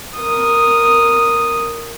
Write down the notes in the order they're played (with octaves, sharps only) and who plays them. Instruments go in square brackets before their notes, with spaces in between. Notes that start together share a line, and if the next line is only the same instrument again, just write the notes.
[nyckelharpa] A#4 D#6